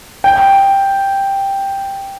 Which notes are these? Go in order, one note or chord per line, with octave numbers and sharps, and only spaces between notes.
G5